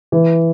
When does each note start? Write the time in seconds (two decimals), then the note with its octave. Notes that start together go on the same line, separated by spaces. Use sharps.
0.12 E3